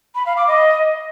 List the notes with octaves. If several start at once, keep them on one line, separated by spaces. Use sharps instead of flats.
B5
F5
D6
D#5